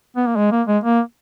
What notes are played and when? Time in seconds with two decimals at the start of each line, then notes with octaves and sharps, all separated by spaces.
0.17 B3
0.27 A#3
0.36 G#3
0.52 A#3
0.67 G#3
0.84 A#3